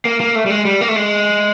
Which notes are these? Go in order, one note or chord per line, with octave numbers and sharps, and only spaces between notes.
A#3
A#3
A3
G3
G#3
G3
A#3
A3
G#3